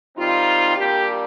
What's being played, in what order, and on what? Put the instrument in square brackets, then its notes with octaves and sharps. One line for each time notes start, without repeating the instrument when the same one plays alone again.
[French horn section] D#3 G3 C4 D#4 F4
A#2 G3 A#3 D4 G4